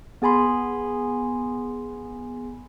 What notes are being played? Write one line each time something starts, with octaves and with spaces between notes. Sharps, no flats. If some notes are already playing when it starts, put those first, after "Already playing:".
B3 G#4 G#5 B5 C6